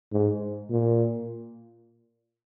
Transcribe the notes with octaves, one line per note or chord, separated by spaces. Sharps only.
G#2
A#2